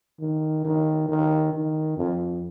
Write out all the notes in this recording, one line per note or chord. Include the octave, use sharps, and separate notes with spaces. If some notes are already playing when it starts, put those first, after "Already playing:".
D#3
D#3
D#3
D#3
F2